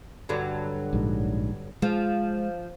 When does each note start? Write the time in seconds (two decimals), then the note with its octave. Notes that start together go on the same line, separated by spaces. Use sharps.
0.29 G2 D3 F#3
0.93 A#1 G#2
1.82 F3 G#3